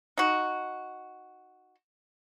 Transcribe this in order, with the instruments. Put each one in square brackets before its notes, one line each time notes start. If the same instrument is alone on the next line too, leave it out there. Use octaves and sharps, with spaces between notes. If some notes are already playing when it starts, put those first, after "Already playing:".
[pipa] D#4 F#4